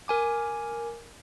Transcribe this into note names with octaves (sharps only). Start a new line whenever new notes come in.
A#4 G#5 D6